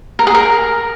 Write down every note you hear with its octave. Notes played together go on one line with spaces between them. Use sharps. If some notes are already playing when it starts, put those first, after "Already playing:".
A#4
G#4
A#4